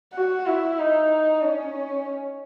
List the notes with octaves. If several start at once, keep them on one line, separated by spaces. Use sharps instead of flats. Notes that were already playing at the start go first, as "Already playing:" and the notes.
F#4
E4
D#4
C#4